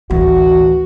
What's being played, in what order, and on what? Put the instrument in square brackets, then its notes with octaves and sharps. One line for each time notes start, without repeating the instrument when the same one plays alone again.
[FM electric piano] G#1 D2 A2 [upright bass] E3 [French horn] F#4